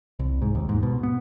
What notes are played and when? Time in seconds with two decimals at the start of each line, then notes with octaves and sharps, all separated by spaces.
0.19 C2
0.42 G#2
0.55 D#2
0.69 G#2
0.83 B2
1.03 B3